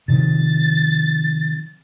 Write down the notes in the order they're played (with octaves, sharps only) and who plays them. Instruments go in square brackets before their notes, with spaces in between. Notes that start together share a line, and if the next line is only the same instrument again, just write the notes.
[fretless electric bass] C3 D#3 F3 [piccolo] A6